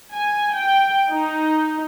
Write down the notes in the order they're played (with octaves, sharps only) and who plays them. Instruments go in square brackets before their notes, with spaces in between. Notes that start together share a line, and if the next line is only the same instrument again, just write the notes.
[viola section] G#5
G5
D#4